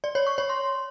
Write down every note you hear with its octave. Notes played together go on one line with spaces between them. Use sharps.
D5
C#5
C#6
C#5
C6